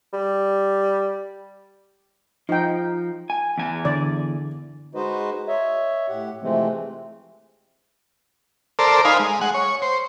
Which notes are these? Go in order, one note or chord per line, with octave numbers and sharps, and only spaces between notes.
G3
F3 D#4 G5
G#5
E2 G#5
D3 D5
G#3 D#4 F#4 B4 C5 D#5
C#5 D#5 E5
A2 G4 F#5
C3 E3 F3 G#3 A3 C4
A4 A#4 C5 D5
D#4 C5 F5 G#5 B5
G#3
G#3 F#5
C#5
C5